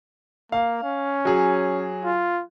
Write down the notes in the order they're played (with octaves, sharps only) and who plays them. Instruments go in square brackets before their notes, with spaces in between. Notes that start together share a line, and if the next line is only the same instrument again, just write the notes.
[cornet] A#3 [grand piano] F5
[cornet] C#4
[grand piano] F#3 G#4
[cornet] F4